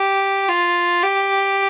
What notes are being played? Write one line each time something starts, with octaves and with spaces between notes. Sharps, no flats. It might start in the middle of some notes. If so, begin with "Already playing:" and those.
Already playing: G4
F4
G4